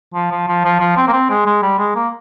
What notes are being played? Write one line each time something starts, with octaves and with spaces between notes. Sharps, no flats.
F3
F3
F3
F3
F3
C4
A#3
C4
G#3
G#3
G3
G#3
A#3